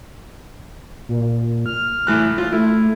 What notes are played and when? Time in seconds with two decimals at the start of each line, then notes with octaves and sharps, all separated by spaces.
1.08 A#2
1.66 F6
2.07 A2 E3 F#6
2.38 F4
2.52 A3 E4